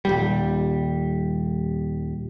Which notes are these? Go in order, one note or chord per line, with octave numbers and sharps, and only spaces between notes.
D#1 A#1 G3